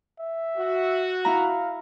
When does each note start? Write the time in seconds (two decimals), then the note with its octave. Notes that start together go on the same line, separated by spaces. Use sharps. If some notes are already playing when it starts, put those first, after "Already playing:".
0.20 E5
0.57 F#4
1.25 E4 F5 A#5